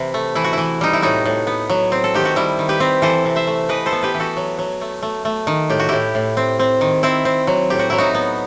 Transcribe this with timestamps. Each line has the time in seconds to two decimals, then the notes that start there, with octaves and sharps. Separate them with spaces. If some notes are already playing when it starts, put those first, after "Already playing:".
Already playing: C3 E3 E4
0.14 A3
0.35 E3 E4
0.44 F#4
0.53 E3 E4
0.81 G3 D#4
0.93 E4
1.02 A2 D#4 F#4
1.25 A2
1.47 B3
1.70 F#3
1.92 C4
2.04 A4
2.14 D#3 G4
2.25 F#4
2.36 G3 E4
2.59 D#3
2.69 G4 B4
2.80 C4
3.02 E3 A4 C5
3.25 C3
3.36 C5 E5
3.47 A3
3.69 E3 B4 D#5
3.86 A4 C5
3.92 B3
4.03 G4 B4
4.14 E3
4.20 F#4 A4
4.37 F#3
4.59 F#3
4.81 A3
5.03 A3
5.25 A3
5.47 D#3
5.70 A2 G4
5.80 F#4
5.89 A2 E4 G4
6.15 A2
6.37 C4
6.59 C4
6.81 D#3
7.03 C4 E4
7.25 C4
7.47 F#3
7.70 A2 G4
7.79 F#4
7.90 F#3 E4
7.98 D#4 F#4
8.15 B3